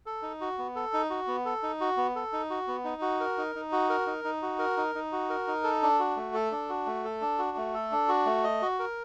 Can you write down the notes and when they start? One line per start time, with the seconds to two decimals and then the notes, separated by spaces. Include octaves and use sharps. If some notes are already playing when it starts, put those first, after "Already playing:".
0.06 A4
0.22 D#4
0.41 F#4
0.58 B3
0.76 A4
0.93 D#4
1.10 F#4
1.27 B3
1.45 A4
1.63 D#4
1.81 F#4
1.97 B3
2.16 A4
2.33 D#4
2.50 F#4
2.68 B3
2.84 D#4
3.02 F#4
3.20 A#4
3.38 D#4
3.55 D#4
3.72 F#4
3.90 A#4
4.07 D#4
4.24 D#4
4.42 F#4
4.59 A#4
4.77 D#4
4.95 D#4
5.12 F#4
5.30 A#4
5.47 D#4
5.64 A4
5.82 D4
5.99 F#4
6.16 A3
6.34 A4
6.51 D4
6.69 F#4
6.86 A3
7.04 A4
7.21 D4
7.39 F#4
7.57 A3
7.74 A4
7.92 D4
8.09 F#4
8.26 A3
8.44 D#5
8.62 F#4
8.79 A#4